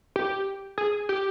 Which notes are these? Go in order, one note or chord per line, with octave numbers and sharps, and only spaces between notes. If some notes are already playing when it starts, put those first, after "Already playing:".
G4
G#4
G4